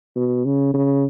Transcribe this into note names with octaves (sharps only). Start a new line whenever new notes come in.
B2
C#3
C#3